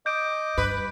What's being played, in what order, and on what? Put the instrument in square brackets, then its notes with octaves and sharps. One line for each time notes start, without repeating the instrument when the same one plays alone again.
[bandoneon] D#5 D6 [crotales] G6 D7
[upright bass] G2 [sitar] B4